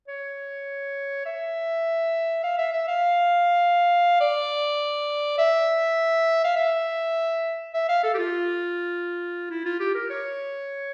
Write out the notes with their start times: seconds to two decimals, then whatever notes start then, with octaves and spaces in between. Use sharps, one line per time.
0.08 C#5
1.26 E5
2.44 F5
2.58 E5
2.73 E5
2.88 F5
4.20 D5
5.38 E5
6.44 F5
6.56 E5
7.74 E5
7.89 F5
8.03 A4
8.14 G4
8.18 F4
9.50 E4
9.65 F4
9.80 G4
9.95 A#4
10.10 C#5